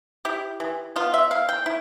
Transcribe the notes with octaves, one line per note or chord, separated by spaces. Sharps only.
E4 G4
E3
B3 F4
E5
E4 F5
G5
E4